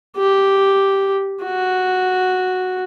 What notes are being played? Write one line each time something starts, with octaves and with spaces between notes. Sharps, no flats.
G4
F#4